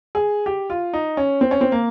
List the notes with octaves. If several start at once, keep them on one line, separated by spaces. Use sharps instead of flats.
G#4
G4
F4
D#4
C#4
C4
C#4
C4
A#3